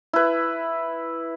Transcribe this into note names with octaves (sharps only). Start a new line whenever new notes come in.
E4 B4